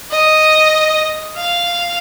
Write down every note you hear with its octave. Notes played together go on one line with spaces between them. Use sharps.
D#5
F5